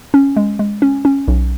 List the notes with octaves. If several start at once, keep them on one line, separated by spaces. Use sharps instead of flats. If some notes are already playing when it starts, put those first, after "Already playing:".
C#4
G#3
G#3
C#4
C#4
B1